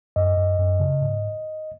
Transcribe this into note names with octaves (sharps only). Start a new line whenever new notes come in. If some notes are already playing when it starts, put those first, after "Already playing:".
F#2 D#5
F#2
F#2
C#3
G#2